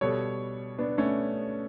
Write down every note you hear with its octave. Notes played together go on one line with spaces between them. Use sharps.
B2 G3 A4 C#5
B3 D4
A3 C#4